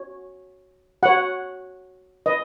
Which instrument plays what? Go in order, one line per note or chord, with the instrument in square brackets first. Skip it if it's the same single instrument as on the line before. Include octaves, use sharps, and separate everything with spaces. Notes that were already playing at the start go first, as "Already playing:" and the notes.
Already playing: [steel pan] F#4 C#5
F#4 C#5 F#5
B4 D#5